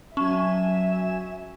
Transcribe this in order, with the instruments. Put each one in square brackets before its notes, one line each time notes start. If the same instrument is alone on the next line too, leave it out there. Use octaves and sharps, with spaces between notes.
[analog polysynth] F#3 G#5 E7 [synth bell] C#4 [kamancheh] E5 [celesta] C#6